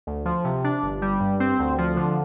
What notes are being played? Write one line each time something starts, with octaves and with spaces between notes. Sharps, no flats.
D2
F3
C3
D4
G1
G3
G2
C4
D2
F3
D3